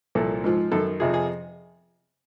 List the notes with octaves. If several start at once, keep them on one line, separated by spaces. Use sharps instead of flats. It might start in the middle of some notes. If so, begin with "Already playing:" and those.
C2 A#2 F3 A4
G#2 F3
F#2 D#3 A4
F2 C3 F3 G#4
G#4